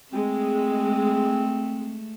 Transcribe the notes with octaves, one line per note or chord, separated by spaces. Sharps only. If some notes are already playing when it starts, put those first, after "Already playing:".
G#3 A3 C4